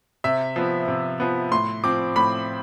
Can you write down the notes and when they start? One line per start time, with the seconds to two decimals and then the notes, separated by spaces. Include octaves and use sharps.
0.24 C3 E5
0.56 F3 B3
0.88 C3
1.20 F3 B3
1.52 A2 C6
1.84 F3 C4 D6
2.16 A2 B5